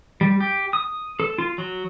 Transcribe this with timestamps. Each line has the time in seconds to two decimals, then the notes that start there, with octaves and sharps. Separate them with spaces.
0.21 G3
0.40 G4
0.73 D#6
1.20 A4
1.38 F4
1.58 F#3